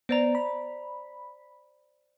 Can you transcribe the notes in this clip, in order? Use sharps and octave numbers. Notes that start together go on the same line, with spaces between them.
B3 C5 D5 A#5
B5